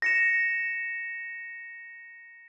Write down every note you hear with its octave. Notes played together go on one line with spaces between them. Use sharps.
A#6 C#7 E7